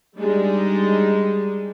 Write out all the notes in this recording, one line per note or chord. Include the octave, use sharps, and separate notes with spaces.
G3 G#3 D4 D#4